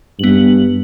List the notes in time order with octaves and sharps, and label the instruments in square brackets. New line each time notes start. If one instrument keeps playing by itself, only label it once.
[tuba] G2 [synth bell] B3 F#7